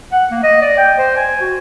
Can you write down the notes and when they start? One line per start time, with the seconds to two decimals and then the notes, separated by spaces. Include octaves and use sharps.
0.12 F#5
0.31 A#3
0.43 D#5
0.62 D5
0.77 G5
0.98 C5
1.17 G#5
1.41 F#4